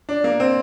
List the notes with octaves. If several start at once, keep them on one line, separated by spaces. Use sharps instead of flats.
D4
A#3
C4